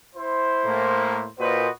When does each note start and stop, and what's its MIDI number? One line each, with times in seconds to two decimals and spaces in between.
0.15 1.28 64
0.15 1.28 72
0.65 1.27 45
0.65 1.27 58
1.39 1.68 46
1.39 1.70 66
1.39 1.70 71
1.39 1.68 72
1.39 1.70 75